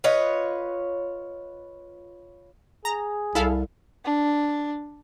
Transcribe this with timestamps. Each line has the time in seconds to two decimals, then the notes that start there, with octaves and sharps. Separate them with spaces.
0.04 F4 B4 C#5 D#5
2.85 G#4 A#5
3.35 C2 E4 A4 F5
4.05 D4